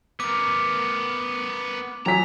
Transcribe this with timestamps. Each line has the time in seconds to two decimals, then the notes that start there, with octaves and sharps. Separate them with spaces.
0.20 B3 A#4 D6
2.06 F#3 G#5 A#5 B6